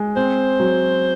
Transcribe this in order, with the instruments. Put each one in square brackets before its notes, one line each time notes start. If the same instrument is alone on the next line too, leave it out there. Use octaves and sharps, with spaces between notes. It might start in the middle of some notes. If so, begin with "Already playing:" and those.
Already playing: [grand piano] G#3
[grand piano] C4 [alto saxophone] C5
[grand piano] F#3